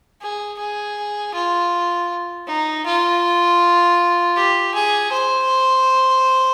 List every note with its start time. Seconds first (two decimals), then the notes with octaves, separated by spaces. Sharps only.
0.21 G#4
0.59 G#4
1.34 F4
2.47 D#4
2.86 F4
4.36 G4
4.74 G#4
5.12 C5